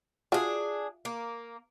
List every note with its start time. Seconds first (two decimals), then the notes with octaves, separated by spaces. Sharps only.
0.32 D4 F4 F#4 G#4 E5
1.05 A#3